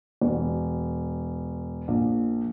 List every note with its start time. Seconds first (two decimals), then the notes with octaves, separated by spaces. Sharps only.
0.21 E1
1.88 A#1